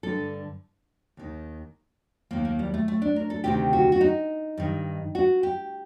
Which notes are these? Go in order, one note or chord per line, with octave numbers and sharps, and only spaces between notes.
G2 D3 A4
D#2 D#3
D#2 D#3 A#3
A#3
G3
A3
A3
D4
A#4
A4
D2 C3 D#3 G4
F#4
F#4
D#4
G2 D#3
F#4
G4